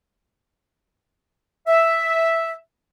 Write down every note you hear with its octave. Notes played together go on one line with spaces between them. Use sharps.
E5